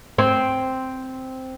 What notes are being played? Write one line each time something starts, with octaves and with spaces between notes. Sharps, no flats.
C4